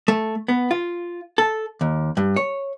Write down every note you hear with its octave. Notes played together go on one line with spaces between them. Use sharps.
A3
B3
F4
A4
D#2
G2
C#5